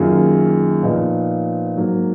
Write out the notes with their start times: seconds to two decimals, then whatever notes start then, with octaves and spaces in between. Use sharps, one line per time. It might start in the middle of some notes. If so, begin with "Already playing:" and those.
Already playing: F#2 D#3 A#3 F4 G#4
0.82 A#2 F3 B3 D#4
1.76 G#2 F#3 A#3